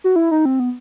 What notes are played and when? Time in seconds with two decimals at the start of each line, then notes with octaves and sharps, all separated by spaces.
0.04 F#4
0.16 E4
0.31 D#4
0.45 C4
0.60 B3